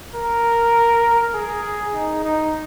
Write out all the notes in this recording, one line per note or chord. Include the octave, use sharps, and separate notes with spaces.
A#4
G#4
D#4
D#4